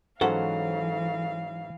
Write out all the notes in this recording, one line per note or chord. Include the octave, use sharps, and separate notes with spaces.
G#2 E3 F#3 C#4 A4 C5 F5 F#5